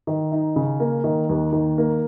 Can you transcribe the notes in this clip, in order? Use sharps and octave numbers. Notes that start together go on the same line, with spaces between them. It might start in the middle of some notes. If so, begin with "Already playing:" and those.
D#3
D#4
C#3
A#3
D#3
D#2
D#3
A#3